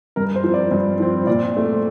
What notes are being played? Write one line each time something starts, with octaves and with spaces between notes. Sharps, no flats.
G2 A#4
C5
F3 C4
D5
G2
F3 C4
A#2 D5
A3 C4